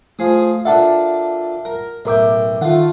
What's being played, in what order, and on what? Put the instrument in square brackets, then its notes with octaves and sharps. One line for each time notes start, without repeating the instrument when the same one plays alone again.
[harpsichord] F3 G#4 D#6 [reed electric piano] A3
[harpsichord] A#2 D4 A4 [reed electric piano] E5 F#5 A5
[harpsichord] A#4
[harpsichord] B1 E5 G5 [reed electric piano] A2 A#4 D6
[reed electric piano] D#3 F#5 [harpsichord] A3 F4